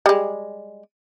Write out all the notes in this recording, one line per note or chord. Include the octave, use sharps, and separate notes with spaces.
G3 G#3